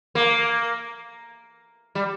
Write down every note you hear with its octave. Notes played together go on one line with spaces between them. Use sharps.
A#3
G3